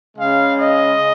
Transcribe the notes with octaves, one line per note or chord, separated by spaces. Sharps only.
C#3 G#3 F5
D#5